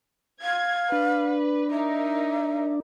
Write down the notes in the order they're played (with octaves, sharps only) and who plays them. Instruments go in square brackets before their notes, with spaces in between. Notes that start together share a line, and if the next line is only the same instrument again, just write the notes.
[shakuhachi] F5 [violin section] G#6
[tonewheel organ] D4 [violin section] B4
[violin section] D#4 A#4 [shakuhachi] E5